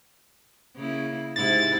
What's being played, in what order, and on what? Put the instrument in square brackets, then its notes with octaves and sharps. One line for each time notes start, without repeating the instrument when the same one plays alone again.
[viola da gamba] C#3 A#3 E4
[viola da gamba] G#2 C3 E4 [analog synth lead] A6